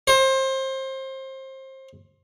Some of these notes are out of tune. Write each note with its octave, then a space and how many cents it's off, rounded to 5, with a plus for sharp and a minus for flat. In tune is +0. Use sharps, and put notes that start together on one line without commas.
C5 +25